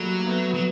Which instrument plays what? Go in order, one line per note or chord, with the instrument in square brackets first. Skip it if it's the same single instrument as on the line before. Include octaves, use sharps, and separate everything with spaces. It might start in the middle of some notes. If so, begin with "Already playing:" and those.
Already playing: [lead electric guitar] F#3 [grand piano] G3 A3 A#3
[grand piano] A#3
A3 B3
[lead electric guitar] F#3 [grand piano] B3